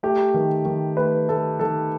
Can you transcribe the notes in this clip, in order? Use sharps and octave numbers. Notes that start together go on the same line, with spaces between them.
A3 G4
D#3
D#3
A3 B4
A3 A4
D#3 A4